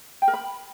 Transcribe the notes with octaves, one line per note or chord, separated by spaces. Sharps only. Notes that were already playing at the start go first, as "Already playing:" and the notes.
G5
A#4
B5